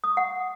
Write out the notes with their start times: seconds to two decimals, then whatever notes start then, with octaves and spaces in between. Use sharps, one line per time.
0.04 D#6
0.10 C#6
0.17 F#5